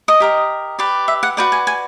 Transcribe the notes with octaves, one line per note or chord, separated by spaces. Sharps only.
D#5
G4 A#4 D#5
G4 B4 D5
E5
F#5
F#4 B4 D5 G5
G#5
G#5